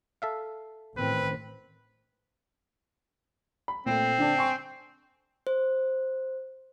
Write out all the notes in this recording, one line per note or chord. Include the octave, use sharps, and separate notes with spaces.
A4 E5 F5
A1 D#3 C4 B4
B5
A#2 A3 C4
D3 D4 A5
G#5 C6 C#6
C5